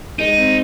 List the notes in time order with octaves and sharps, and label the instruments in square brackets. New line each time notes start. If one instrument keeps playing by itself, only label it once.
[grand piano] G#3 [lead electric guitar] D#4
[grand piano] C4